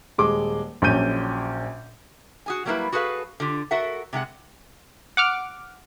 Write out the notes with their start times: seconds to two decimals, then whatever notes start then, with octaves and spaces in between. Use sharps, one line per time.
0.18 D#1 G#3 D6
0.82 A#1 A#2 F#3 C#4 G6 D#7
2.46 F#4 G#4 G#5
2.65 F#3 G3 A#3 C#4 E4 B4
2.92 F#4 G#4 A4 B4 F5
3.40 D3 F4 G4
3.71 F#4 A4 A#4 E5 F#5
4.13 C3 G#3 F#4 F#5
5.17 F#5 D6 F6